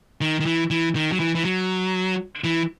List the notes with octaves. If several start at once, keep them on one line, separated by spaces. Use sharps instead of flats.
D#3
D#3
E3
E3
D#3
F#3
E3
E3
F#3
E3